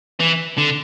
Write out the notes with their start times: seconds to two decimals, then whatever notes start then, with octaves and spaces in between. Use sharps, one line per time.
0.20 E3
0.58 D3